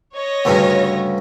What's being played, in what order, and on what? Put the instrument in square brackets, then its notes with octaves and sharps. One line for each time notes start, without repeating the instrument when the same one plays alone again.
[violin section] C#5 D#5 A#6
[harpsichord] D2 G2 C#3